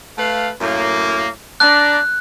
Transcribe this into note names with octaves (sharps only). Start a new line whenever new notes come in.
A3 B4 F5
F#2 A2 A#3
D4 A#5 F#6